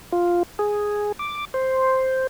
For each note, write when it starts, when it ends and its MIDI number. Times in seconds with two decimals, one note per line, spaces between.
0.12 0.43 65
0.59 1.12 68
1.19 1.45 86
1.54 2.27 72